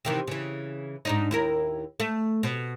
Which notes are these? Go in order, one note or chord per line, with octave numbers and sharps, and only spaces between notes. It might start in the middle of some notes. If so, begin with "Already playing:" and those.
C3 D#3 E3
C#3 E3
G#2 D4 D#4
D#2 E4 A#4
A3
B2